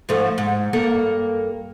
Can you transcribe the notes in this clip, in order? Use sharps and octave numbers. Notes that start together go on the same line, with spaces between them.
G#2 F3 A3
G#2
G2 A#3 A4